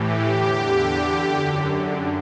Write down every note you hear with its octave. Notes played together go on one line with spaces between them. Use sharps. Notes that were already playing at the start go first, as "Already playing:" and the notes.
Already playing: A2 E3 G4
E2 D3
F#2 D3